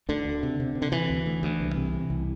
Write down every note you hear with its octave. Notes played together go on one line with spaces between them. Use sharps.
D2 D3
D2
C3
C3
C3
D3
C3 E3
D2
D2
D2
C2
C3
C3
C2